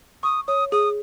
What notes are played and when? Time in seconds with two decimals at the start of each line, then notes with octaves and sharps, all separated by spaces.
0.23 C#6 D#6
0.48 C#5 D#6
0.72 G#4 D#6